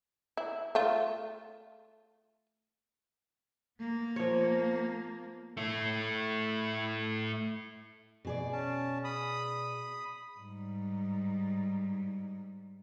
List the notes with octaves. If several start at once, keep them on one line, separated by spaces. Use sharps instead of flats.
E4
A3 F4
A#3 B3
F3 C#5
A3 E4
B2 G#4 D5
C#4 A5
B5 D#6
G#2 G3